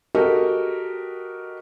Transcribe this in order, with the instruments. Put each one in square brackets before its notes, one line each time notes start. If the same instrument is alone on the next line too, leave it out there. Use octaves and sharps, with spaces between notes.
[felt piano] F#4 G4 A4 A#4 D#5 G5